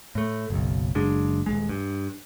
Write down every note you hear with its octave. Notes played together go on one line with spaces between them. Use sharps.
A2 A3
F#1 B1
F#1 G#3 D4
D#1 D#2 G#3
G2